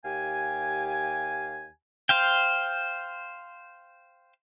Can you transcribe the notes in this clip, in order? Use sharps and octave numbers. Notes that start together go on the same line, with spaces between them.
D#2 G4 F5 G#5
C5 F5 G5